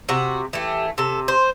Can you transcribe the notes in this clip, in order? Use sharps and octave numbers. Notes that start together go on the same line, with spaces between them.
C3 F#4
E3 A3 G4
C3 A4
C5